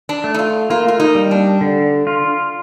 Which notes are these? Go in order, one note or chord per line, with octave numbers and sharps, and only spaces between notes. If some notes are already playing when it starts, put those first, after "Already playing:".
D4
A3
D#4
F4
A#3 F4
F4
D#4
G3
D4
D3
F4